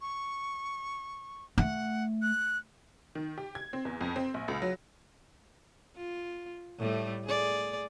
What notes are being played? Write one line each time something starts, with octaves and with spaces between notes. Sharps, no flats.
C#6
A3 F#5
F#6
D#3
G4
G#6
C4
E2
F2
C4
A#1
C#2
F#3
F4
A2 G3 A3
G#4 D5